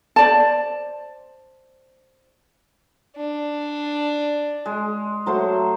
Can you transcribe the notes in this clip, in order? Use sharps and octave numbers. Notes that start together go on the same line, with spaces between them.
C5 D5 A5
D4
G#3
F#3 A3 C5